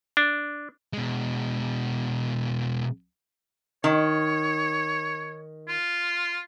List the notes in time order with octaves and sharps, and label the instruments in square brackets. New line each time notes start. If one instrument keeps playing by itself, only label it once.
[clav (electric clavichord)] D4
[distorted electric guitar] B2 G#3
[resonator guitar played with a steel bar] D#3 [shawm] C#5
[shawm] F4